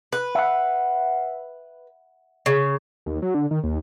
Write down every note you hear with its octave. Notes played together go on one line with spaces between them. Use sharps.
B4
E5 F#5
C#3
D#2
F#3
D3
D#3
D#2